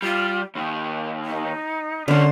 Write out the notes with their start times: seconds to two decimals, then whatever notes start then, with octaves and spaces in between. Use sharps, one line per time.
0.02 G3 F4
0.55 D#2 D#3 G5
1.25 D#4
2.08 G2 D3 C#4 D4 C6